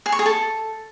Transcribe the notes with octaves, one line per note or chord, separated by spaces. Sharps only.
G#4
C#6
G#4
A4